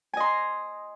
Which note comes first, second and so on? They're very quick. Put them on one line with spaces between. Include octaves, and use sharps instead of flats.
G#5 D#5 C6 A#5